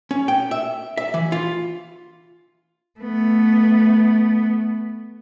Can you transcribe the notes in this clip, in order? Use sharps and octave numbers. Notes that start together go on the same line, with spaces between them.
C#4
G5
E5
E5
E3
F4
A3 B3